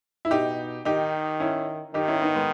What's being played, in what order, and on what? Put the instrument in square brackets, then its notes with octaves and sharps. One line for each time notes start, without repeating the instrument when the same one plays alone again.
[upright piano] E4
[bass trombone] B2 [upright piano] D#4 G4
[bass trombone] D#3 [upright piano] D#4 G4
[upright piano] C#4 E4
[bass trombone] D#3 [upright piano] D#4 G4
[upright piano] C#4 E4
B3 D#4
G#3 B3